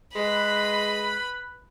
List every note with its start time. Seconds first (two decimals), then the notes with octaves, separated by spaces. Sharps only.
0.15 G#3 B4 B5